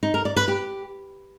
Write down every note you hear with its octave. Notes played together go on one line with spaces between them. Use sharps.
D#4
A#4
D5
B4
G4